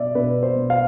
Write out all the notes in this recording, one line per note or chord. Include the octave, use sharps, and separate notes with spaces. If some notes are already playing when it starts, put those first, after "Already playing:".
Already playing: B2 D5 E5
B2 B4
C5
B2
F5